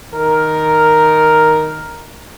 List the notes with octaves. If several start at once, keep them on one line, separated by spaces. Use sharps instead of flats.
D#3 A#4